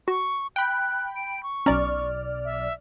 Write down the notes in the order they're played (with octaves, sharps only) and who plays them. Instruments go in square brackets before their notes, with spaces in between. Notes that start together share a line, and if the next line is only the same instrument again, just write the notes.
[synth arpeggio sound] F#4 [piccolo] C#6
[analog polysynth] G5 B5 [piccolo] F#6
[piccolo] D7
C#6
[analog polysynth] B1 D5 F6 [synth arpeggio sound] C#4 A#5
[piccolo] E5